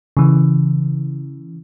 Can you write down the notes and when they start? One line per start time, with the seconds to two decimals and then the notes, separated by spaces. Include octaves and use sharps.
0.17 C#3 E3